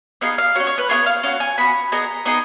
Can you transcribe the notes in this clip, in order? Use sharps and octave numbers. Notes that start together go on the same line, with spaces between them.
B3 D#4 G#4 F5
F5
C#4 F#4 C#5
C#5
B4
B3 F4 G#4 C#5
F5
C#4 F#4 F5
G#5
B3 F#4 B5
B3 D#4 G#4 A#5
B3 D#4 G#4